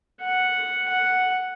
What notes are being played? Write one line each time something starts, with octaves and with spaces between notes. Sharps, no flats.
F#5
F#5